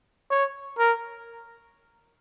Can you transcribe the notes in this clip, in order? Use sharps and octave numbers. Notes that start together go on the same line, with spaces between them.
C#5
A#4